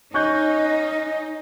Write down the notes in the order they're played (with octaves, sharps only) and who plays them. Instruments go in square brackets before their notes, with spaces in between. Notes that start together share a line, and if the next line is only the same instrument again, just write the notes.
[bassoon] C#4 [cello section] D#4 [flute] D#5 [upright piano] C#6 F#6 G6